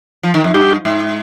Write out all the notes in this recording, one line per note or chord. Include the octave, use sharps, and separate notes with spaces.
F3
D#3
F2
G2 G4
G#2